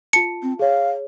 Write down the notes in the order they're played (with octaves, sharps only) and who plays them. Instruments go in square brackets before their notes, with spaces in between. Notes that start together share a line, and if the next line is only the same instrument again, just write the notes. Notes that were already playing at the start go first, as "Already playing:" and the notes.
[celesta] F4 A5 [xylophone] C#7
[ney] C4
[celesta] G#4 C#5 [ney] F5